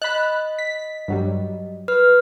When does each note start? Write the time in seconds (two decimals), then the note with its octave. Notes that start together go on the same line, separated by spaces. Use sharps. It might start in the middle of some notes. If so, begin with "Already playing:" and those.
0.02 D#5 B5 F#6
0.58 B6
1.08 G2 F#3 G3
1.88 B4 F6